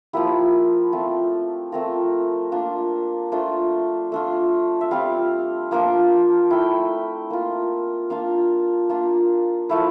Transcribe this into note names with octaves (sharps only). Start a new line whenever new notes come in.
F3 A#3 E4 G4
A3 C4 F4
A3 C4 F4 A#4
A#3 D4 F4
A3 D4 F4 C5
A3 D4 F4
E5
G3 C4 F4 F5
F3 A#3 D4 F4
A3 E4 G5
A#3 F4
A#3 D4 F4 F5
A#3 D4 F4
F3 A3 E4 F5